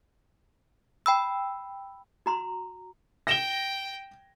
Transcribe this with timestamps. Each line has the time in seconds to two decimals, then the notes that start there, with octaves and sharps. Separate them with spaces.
1.06 G5 B5 E6
2.26 F#4 A#5 C6
3.27 G5 A#6 E7 G7